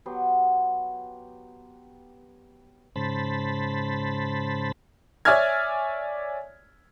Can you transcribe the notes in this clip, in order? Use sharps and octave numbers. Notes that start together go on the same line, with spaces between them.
F#3 B3 G4 C6
G#2 C#3 C5 A5 B5
C#5 D5 E5 G#5 F6 G#6